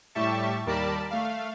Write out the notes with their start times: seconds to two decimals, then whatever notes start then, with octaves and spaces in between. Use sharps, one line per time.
0.15 A2 G3 G4 E5 A5 C#6
0.66 D#2 G3 A#4 D5 A5 B5
1.11 A3 F5